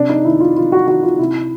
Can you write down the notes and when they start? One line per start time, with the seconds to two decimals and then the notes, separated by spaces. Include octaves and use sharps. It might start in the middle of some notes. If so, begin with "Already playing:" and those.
Already playing: C3 D4
0.09 D#4
0.25 D#3 E4
0.40 F4
0.56 C3 F4
0.72 F#4
0.87 D#3 F#4
1.03 F4
1.19 C3 E4